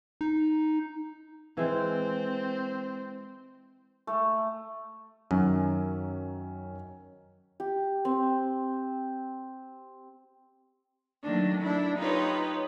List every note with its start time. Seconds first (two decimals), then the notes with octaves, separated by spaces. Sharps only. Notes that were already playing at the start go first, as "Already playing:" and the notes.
0.21 D#4
1.57 E3 G#3 C4
4.07 A3
5.31 F#2 D#3 F#3 C#4
7.60 G4
8.05 C4
11.23 D#3 F#3 A3 A#3 D4
11.62 D4 E4
11.98 D#4 F4 G4 B4 C#5